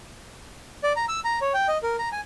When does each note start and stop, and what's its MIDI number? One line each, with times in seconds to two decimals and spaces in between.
0.84 0.93 74
0.96 1.06 82
1.09 1.20 88
1.25 1.39 82
1.42 1.53 73
1.54 1.67 79
1.68 1.78 75
1.83 1.96 70
1.99 2.09 82
2.12 2.21 80